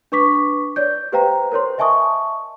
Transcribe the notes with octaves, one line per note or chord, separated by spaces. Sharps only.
D4 B4 C#6 D6 B6
C#5 D5 G6
G4 B4 C5 F5 G5 A#5
A#4 C5 C#5 C6
D#5 E5 G#5 A5 C#6 D#6